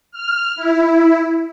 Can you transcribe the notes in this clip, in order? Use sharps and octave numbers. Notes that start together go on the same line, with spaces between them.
F6
E4